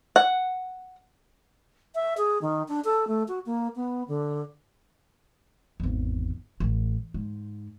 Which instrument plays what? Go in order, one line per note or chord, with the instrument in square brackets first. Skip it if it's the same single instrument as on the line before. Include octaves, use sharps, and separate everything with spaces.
[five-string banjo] F#5
[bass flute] E5
G#4
D#3
D4
A4
A3
F#4
A#3
B3
D3
[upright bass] G#1 E2
A1
G#2